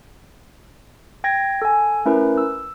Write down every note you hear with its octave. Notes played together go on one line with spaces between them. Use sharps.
G5 G#6 A#6
A4 G#5
A3 C#4 E4 A#4 B4
E6